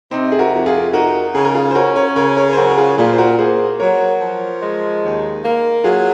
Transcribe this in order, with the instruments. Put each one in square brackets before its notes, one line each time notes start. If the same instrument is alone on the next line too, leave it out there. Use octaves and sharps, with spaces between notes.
[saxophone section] C3 [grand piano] C4 D#4
[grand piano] G#4
F#4 A#4
[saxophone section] F2
[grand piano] F4 G#4
[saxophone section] D#4 [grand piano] F#4 A#4
[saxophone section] C#3 [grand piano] G#4
[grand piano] A#4
F4 G#4
C5
[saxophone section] C#4 [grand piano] F#4 A#4
[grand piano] A#4 C#5
[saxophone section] C#3 [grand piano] A#4 C#5
[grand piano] A#4 C#5
C5
[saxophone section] F#3 [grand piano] F#4 A#4
[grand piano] A#4
F4 G#4
[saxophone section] A#2 [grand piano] F4 G#4
[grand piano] C5
F#4 A#4
[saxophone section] A#3 [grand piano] G#4 C5
[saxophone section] F#3 [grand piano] A#4 C#5
[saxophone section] F3
G#3
D#2
A#3
[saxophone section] F#3 [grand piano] F4 G#4